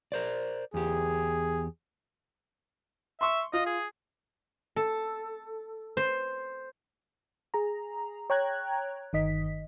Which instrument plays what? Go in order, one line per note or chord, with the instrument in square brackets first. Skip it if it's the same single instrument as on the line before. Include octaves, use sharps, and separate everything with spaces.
[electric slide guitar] A#4 C5 D5
[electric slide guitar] E2 G4 [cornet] G#4
[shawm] E5 [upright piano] C6 C#6
[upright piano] F4 [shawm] D#5
[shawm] G#4
[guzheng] A4
C5
[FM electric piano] G#4 A#5
C#5 G5 A#5 F#6 G#6
G1 D#3 D#5 B6